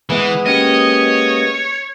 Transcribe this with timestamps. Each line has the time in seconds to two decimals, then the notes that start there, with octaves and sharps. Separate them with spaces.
0.10 E3 G#3 B3
0.46 A#3 C#4 G4 C#5 D#5